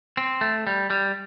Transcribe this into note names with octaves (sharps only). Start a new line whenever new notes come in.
C4
A3
G3
G3